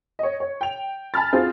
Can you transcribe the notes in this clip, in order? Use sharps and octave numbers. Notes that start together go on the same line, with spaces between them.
C#5 D#5
C#5
G5 F7
G#5 A5 B5 F6 A6
C4 F4 F#4 G#4 C5